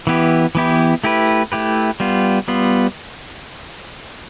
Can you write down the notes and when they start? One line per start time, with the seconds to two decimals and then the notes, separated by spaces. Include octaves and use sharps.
0.07 E3 B3 E4 G4
0.55 E3 B3 E4 G4
1.04 A3 E4 G4 B4
1.52 A3 E4 G4 B4
2.00 G3 B3 F4
2.48 G3 B3 F4